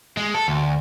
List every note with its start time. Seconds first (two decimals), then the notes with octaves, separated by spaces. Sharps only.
0.17 G#3
0.35 A4
0.48 D2